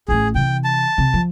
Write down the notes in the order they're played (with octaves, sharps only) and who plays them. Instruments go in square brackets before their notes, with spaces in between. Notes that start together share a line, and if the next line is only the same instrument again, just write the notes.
[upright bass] A1 A3 [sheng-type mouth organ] G#4
[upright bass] C3 E3 [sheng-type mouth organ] G5
[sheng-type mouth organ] A5
[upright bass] C3
F3